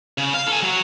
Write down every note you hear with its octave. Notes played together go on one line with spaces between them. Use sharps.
C#3
F5
A4 G#5
F#3 C#5